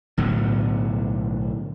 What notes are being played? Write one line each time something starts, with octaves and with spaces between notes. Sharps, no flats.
B1 A2 D3 B3